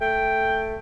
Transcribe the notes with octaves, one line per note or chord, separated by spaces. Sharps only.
A3 G5